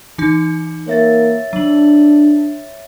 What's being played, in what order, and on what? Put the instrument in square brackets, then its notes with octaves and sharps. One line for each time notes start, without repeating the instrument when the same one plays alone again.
[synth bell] E3 D#4
[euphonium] A#3 [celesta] C#5 E5 A6
[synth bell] F#3 F#7 [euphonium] D4